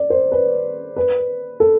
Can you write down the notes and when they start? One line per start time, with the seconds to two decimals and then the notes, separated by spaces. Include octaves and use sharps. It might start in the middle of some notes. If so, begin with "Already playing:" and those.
Already playing: D5
0.10 C5
0.32 B4
0.96 B4
1.60 A4